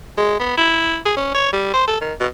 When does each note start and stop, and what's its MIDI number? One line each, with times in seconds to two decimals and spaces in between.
0.18 0.35 56
0.40 0.57 59
0.58 0.98 64
1.06 1.13 68
1.17 1.30 61
1.35 1.52 73
1.53 1.70 55
1.74 1.87 72
1.88 2.00 69
2.01 2.13 51
2.20 2.27 47